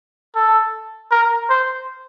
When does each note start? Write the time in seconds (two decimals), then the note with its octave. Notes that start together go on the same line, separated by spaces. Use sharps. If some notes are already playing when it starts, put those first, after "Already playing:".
0.36 A4
1.11 A#4
1.50 C5